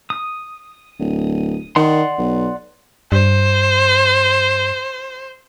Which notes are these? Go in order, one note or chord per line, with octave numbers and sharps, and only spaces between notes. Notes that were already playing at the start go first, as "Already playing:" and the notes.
D#6
D1
D#3 D5 F#5 C6
B1
G2 C5